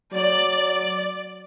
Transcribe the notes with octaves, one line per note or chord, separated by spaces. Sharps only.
F#3 D5